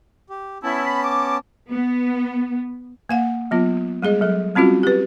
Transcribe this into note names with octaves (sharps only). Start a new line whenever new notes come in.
G4
B3 C#4 E4 A5
B5
D6
B3
A#3 F5 F#5
F#3 B3 F4
G3 G#3 G#4 D#5
F#3 A4
G3 C4 C#4 F4 F#4
G4 B4